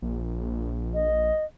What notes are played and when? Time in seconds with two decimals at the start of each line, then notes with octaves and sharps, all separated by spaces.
0.02 A#1
0.94 D#5